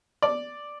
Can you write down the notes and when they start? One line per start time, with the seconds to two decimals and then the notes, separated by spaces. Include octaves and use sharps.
0.22 D5